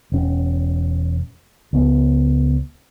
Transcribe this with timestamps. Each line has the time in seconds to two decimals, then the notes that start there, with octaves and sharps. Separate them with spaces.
0.12 E1 C#4
1.73 C#2 B3